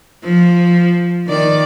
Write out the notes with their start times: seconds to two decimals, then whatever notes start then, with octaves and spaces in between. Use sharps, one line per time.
0.24 F3
1.27 D#3 D5